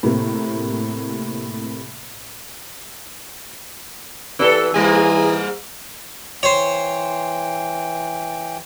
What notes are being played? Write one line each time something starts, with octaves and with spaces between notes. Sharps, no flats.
A2 C3 A#3
E3 B3 G4 A4 B4 D5
G#2 E3 G3 A#3 G#4
E3 C5 C#5 G5